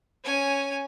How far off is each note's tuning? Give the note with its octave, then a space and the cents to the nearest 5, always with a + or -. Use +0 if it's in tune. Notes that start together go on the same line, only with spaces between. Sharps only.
C#4 +0 G#5 +0